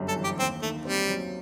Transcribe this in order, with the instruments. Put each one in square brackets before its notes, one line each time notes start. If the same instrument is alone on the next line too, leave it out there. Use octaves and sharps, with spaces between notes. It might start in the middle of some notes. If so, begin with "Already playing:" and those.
Already playing: [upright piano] G1 F#2 G3
[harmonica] A4
[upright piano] E3
[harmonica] G4
[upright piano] D#2 [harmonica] C4
[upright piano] D#3 [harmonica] A3
[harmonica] G3 [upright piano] C4
[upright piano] F#3